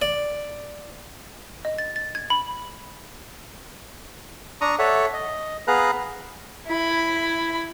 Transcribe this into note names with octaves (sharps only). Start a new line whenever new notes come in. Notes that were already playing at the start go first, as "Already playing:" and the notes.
D5
D#5
A6
A6
G#6
B5
D4 A#5 C#6 D#6
A4 C#5 E5 F#5
D#5
B3 G#4 B4 F5 A#5 F#6
E4 B5